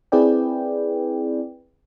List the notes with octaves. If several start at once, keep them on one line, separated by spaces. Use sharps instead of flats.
C4 E4 G#4 B4 D5 G5